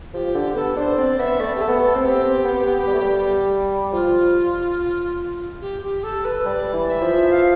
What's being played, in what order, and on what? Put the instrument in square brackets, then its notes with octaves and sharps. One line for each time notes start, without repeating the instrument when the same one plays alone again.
[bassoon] F3 [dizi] G4
[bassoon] D3
[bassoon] B3 [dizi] A4
[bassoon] D4 [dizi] C5
[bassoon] C4 [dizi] D5
[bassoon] B3 [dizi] E5
[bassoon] A3 [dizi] D5
[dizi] G4
A4
[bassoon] B3
[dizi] G4
A4
[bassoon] C4
[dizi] G4
[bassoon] C4
B3
B3
G3
A3
G3
[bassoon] F3 [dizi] F4
[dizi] G4
G4
A4
B4
[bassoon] G3 [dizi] D5
[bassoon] E3
[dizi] E5
[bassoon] F3
[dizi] F5